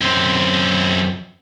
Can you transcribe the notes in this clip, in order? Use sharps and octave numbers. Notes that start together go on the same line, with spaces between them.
F#2 C4